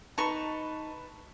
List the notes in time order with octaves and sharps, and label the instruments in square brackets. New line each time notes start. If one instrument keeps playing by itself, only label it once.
[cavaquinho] D#4 C#6 [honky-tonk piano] B4 A5